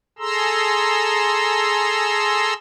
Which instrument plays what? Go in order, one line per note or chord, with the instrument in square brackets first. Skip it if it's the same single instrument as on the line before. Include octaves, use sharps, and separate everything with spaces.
[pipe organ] G#4 A4 A#5 C6 E6